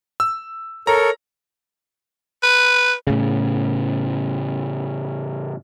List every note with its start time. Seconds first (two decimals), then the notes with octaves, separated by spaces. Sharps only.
0.20 E6
0.87 A4 A#4 C#5 A#5
2.43 B4
3.07 A2 C#3